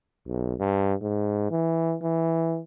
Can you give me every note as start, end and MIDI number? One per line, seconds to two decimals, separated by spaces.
0.28 0.54 35
0.60 0.94 43
1.02 1.47 44
1.50 1.96 52
2.02 2.60 52